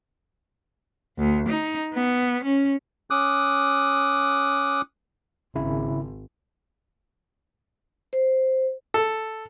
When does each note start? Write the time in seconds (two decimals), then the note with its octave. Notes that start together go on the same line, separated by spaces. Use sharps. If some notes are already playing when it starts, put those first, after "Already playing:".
1.18 D2
1.49 D#4
1.94 B3
2.44 C#4
3.10 C#4 D6 D#6 F#6
5.55 G#1 C#3 E4
8.13 C5
8.94 A4